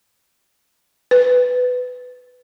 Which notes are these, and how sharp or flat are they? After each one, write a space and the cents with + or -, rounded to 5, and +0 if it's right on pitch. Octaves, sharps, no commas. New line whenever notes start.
B4 +15